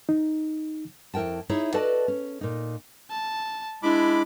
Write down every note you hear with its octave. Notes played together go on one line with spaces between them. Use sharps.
D#4
F2 E4 A#4 G5 A5
D#4 E4 G#4 C#5 E5
F#4 A4 B4 D5 D#5 A5
C#4
A#2 D#4
A5
G#3 D4 E4 B5 D6